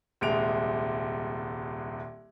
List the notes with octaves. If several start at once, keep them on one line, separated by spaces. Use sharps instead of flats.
D#1 C2 G#3 D7 F7